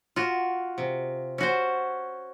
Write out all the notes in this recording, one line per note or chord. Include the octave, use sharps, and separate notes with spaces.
F4 F#4
C3
C#4 F#4 C5